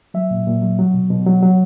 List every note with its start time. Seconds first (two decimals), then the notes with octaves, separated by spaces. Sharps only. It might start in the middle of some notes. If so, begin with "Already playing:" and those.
0.14 F#3 E5
0.31 A#2
0.47 A#2
0.62 F#3
0.79 F#3
0.94 B2
1.10 B2
1.26 F#3
1.42 F#3